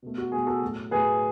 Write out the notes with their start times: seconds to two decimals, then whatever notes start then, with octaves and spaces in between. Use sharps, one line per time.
0.02 B2 A3
0.18 F#4
0.32 B2 A3 G#4
0.47 F#4 A4
0.62 A2 F#3 A3
0.91 A2 F#3 A3 G#4 B4